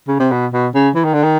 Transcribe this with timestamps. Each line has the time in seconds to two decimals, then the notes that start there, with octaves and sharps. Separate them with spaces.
0.08 C#3
0.20 C3
0.32 B2
0.53 B2
0.75 C#3
0.95 E3
1.04 D#3
1.14 D3
1.23 D#3